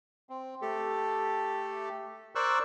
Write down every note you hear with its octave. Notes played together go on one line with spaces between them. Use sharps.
C4
A3 G4 A4
A#4 C5 D5 C#6 E6 F#6